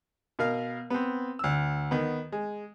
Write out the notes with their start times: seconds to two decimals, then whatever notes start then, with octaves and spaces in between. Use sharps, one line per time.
0.39 B2 A#4 F5
0.90 B3 C4
1.39 D2 E6
1.91 D#3 B3
2.32 G#3